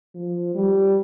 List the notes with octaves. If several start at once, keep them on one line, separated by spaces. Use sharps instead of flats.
F3
G3